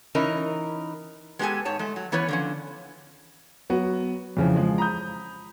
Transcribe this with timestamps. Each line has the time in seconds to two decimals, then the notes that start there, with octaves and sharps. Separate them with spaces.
0.15 E3 C#4 D#4 A#4
1.39 G#3 B3 D#4 G4 A4 G#5
1.65 G#2 C#5 A5
1.79 G#3 A3
1.96 F#3
2.12 E3 B3 C#4 B4 C#5
2.28 D3 F3 C#4
3.70 F#3 B3 F#4
4.37 F2 C#3 E3 F3
4.56 F3 G#3
4.78 A#5 B5 D#6 G6